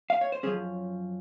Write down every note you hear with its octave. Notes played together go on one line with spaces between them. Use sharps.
F5
C#5
C5
F#2 F3 G#3 C#4 G#4